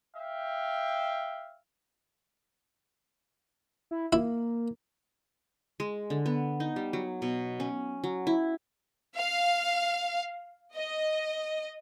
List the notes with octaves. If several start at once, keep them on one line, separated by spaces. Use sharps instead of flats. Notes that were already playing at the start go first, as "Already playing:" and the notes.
E5 F5 G5
E4
A#3 E4
G#3
D3
B3
D#4
G3
F#3
B2
C#4
F#3
E4
F5
D#5